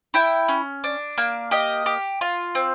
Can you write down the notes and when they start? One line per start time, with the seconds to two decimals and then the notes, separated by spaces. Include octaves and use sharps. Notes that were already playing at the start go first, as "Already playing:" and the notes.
0.14 E4 G5
0.48 C#4
0.84 D4
1.18 A#3
1.51 G4 D#5
1.86 G4
2.21 F4
2.55 C4